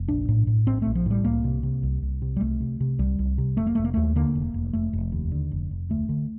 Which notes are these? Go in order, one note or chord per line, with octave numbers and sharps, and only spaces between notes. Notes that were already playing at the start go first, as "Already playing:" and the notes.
Already playing: F1
A#1 D4
A2
A2
A#1 C4
A#1 A3
F3
A2 G3
C2 A#3
C3
C3
C2
C2
C3
G3
C2 A3
C3
C3
C2 G3
C2
C3
F1 A3
A#3
F1 A3
A#3
D#2 A3
D3 A#3
F1
F1
F1 A3
F1
D#2
D3
F1
F1
D2 A3
D3